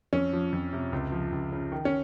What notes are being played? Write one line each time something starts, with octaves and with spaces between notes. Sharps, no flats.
F2 C#4
F3
F2
C3
C#2
F3
C#2
C#3
D#3
C#4